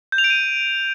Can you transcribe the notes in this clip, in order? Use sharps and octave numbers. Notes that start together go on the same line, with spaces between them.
G6
F7
D7
D#7